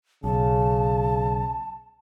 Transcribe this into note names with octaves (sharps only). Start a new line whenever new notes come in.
B1 C#3 A5